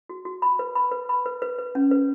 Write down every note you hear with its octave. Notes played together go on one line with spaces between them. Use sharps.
F#4
F#4
B5
B4
B5
B4
B5
B4
B4
B4
C#4
B4